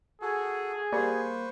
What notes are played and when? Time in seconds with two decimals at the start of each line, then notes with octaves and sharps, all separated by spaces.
0.22 F#4 G#4 A4
0.93 G3 A#3 B4 C5 C#6